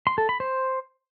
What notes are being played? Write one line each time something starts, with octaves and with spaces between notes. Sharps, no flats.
C6
A4
B5
C5